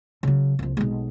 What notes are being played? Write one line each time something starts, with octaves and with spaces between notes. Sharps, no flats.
C#3 F#3
C2 F3
B1 G#3